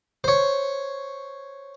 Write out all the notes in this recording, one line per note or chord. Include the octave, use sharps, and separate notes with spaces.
C5 C#5